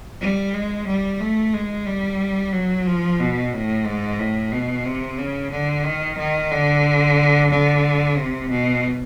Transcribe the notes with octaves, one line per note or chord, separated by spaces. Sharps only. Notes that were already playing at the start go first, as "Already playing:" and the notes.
G3
G#3
G3
A3
G#3
G3
F#3
F3
B2
A2
G#2
A2
B2
C3
C#3
D3
D#3
D#3
D3
D3
C3
B2